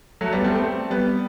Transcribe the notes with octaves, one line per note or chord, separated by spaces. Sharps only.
F#3 A3
G3 B3
A3 C4
A3 C4
G3 B3